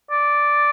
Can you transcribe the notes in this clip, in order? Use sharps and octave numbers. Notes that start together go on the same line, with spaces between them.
D5